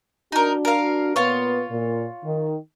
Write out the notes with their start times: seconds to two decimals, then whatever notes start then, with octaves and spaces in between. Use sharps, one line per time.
0.32 D4 D#4 F#4 A#4
0.65 A#4 F5
1.16 A#2 B3 F4 B4 C#5
1.70 A#2
2.24 D#3